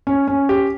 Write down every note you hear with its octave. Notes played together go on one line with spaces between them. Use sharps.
C#4
C#4
G4